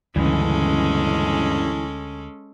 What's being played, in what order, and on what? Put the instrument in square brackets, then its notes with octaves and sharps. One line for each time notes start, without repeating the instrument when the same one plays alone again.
[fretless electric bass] D2 [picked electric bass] G2 C#3 [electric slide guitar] E3 [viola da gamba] G#3 C#4 A4